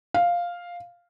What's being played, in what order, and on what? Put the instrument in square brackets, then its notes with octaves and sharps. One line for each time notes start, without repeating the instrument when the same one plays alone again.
[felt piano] F5